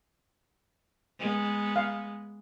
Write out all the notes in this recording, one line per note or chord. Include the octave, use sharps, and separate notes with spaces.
G#3 B3
F5